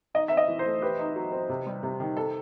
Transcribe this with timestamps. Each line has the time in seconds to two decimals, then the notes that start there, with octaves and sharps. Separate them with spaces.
0.14 D#4 D#5
0.28 C4 E5
0.37 D#5
0.48 E3
0.59 C5
0.65 A3
0.82 G4 B4
0.99 D#4
1.16 F#3
1.32 C4
1.49 C3
1.66 G3
1.83 C3
2.00 D#3
2.17 A4